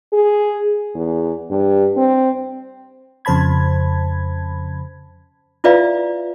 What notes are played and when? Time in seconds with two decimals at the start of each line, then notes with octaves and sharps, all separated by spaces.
0.13 G#4
0.95 E2
1.51 G2
1.97 C4
3.25 F2 C#3 C5 A5 B5 G#6
5.64 E4 F4 B4 D5 E5 F5